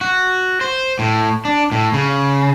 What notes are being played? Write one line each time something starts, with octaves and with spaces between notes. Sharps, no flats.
F#4
C5
A2
D4
A2
C#3